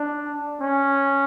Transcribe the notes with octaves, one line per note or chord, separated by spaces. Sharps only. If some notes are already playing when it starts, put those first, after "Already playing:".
Already playing: D4
C#4